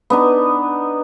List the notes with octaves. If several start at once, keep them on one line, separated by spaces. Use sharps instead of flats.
B3 D4 D#4